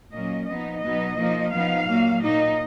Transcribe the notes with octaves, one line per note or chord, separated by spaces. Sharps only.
A#2 F#3 A#3 C#4 D#5
F3 B3 D#4 D#5
B2 F#3 B3 D#4 D#5
F3 A#3 D#4
F3 B3 D#4 F5
A#2 F#3 A#3
A#2 F#3 A#3 D#4 D#5